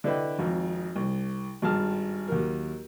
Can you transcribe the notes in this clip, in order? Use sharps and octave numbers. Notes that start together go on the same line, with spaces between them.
D3 D4 E4 B4 D#5 G5
G#1 F2
C2
G#1 G2 G#4 A5 F6
D#2 F#3 A#4